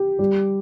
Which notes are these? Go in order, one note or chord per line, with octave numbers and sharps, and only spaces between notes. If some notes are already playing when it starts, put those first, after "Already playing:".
Already playing: G4
G3